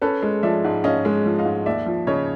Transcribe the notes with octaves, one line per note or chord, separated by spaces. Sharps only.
C#4 A4 B4
G#3
F3 D5 E5
G#2
C#4 D#5 F5
G#3
F3
D#5 F5
G#2
D#2 D5 E5
F3
C#3 C#5 D#5